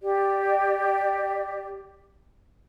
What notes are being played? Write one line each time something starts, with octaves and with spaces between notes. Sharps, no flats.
G4 D5